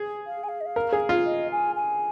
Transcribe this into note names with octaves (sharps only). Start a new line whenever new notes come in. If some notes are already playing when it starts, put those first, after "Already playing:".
Already playing: G#4
F5
G#5
F5
D#5
F5
A#4
G#4
F4
D#5
G#5
G#5